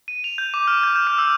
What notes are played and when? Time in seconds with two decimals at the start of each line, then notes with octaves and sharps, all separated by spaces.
0.08 D#7
0.24 F7
0.38 G6
0.54 D6
0.67 F6
0.83 G6
0.96 G6
1.07 F6
1.18 E6